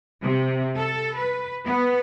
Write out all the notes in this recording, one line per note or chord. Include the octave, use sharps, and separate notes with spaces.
C3
A4
B4
B3